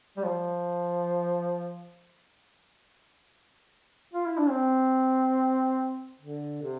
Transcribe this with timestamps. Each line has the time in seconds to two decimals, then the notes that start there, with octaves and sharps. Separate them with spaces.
0.17 G3
0.24 F3
4.13 F4
4.26 E4
4.38 D4
4.49 C4
6.20 D3
6.62 C3